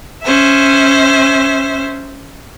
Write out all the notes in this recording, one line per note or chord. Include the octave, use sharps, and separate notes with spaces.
C#4 C5 E5